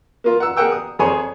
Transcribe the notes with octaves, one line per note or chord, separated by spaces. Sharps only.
A#3 F4
F#5 E6
G#4 A#4 F#5 G5 E6
D#6
F2 G#4 C5 C#5 G#5